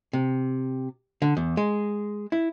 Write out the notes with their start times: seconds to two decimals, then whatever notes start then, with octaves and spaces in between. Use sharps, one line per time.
0.13 C3
1.22 D3
1.37 E2
1.57 G#3
2.32 E4